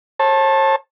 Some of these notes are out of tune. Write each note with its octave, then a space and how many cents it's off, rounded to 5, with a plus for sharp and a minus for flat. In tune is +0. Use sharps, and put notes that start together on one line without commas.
C#5 -45 A5 +0